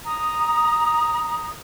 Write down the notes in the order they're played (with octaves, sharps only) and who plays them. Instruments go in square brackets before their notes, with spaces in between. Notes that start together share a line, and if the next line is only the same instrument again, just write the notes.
[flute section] A#5 D#6